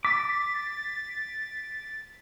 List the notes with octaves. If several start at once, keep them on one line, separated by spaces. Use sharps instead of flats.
D6 A6 B6